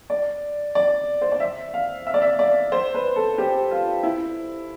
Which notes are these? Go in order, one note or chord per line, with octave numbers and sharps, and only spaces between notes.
D5
D5
C5
D5
E5
F5
E5
D5
E5
D5
C5
B4
A4
G4
F4
E4